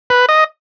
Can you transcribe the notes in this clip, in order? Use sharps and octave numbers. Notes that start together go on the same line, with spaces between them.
B4
D#5